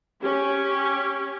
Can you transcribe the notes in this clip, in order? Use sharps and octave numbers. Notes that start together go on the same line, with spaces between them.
C#4 G4